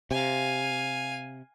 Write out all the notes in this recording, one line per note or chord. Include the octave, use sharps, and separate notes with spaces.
C3 F5 G#5